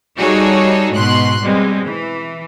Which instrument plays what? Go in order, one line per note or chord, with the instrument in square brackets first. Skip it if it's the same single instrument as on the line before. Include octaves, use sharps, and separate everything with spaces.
[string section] G3 D#4 F#4 G#4 A4 C#5
G#2 B2 C6 F#6
B2 G3 G#3 C4
E3